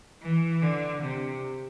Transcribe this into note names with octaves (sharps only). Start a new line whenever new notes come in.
E3
D3
C3